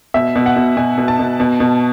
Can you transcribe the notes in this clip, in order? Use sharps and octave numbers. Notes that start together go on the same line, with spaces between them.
B2 E5
B2
F#5
B2
B2 G#5
B2
A5
B2
B2
B2